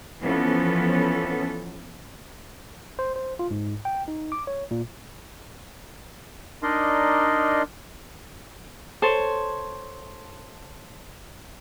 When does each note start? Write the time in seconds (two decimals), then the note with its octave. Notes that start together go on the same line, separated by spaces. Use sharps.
0.21 E3 F3 B3 C#4 A4
2.99 C5
3.16 C5
3.39 F4
3.51 G#2
3.85 G5
4.08 D#4
4.32 D6
4.47 C#5
4.71 A#2
6.63 D4 D#4 A#4 D5 D#5 C6
9.02 A4 C5 C#5